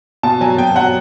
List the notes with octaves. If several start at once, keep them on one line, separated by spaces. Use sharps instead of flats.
B2 A5
F#3 G#5
B2 G5
F#3 F#5